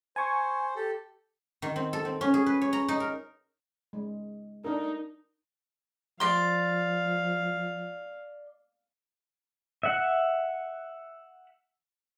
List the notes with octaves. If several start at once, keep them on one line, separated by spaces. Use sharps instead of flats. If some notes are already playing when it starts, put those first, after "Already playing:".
C5 G#5 C#6
G4 A4
D#3
C4
A4
C4
C#4
G#4
B4
C#5
A#5
D#4
A#4
G#3
D4 D#4 A#4
F3 D5 F5 C6
E5 F#5